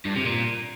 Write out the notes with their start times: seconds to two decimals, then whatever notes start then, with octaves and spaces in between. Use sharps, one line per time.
0.05 G2
0.16 C3
0.26 A#2